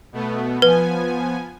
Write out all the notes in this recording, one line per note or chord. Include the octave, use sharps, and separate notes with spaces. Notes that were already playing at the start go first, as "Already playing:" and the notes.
B2 A3 B3
F3 B3 B4 G#5